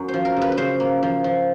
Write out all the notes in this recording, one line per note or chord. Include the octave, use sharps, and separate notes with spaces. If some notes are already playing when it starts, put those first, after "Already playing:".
Already playing: F#2
C5
F3
A#4
C#3
B4
B4
C#3 C5
A#3
F3
F3